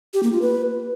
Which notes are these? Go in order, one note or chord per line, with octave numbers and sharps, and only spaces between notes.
G4
A#3
F4
B4